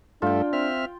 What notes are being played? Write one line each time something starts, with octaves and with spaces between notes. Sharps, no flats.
G2 A3 D4 F4 A4 G5
C4 E5 F6